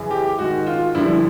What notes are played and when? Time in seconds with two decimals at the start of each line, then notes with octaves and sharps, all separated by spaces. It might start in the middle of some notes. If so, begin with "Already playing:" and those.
Already playing: F#2 C#3 E3
0.11 G4
0.39 G#2 D#3 F#4
0.67 F4
0.95 G2 D3 F3 E4